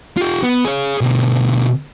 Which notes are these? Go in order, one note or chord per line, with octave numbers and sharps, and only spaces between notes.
F4 G4
B3
G#4 C#5
B2 D3